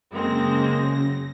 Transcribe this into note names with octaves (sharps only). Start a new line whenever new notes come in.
F#2 C#3 G#3 A#3 C4 A#6